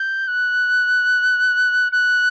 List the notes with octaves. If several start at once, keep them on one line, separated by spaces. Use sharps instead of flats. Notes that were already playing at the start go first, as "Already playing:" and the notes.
Already playing: G6
F#6
F#6